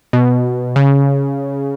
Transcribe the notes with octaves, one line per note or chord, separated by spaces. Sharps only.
B2
C#3